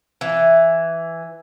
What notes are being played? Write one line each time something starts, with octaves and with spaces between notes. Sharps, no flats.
E3